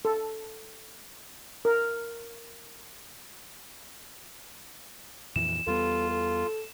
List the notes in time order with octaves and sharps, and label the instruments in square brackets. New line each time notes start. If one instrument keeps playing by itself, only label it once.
[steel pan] A4
A#4
[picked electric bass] F2 A#2 E3 [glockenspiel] E7
[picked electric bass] E2 G3 B3 [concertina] F4 [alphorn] A4
[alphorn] A4